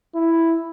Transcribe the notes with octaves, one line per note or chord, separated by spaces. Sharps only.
E4